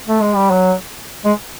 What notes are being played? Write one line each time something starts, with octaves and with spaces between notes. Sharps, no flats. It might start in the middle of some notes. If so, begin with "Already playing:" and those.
A3
G#3
G3
F#3
G#3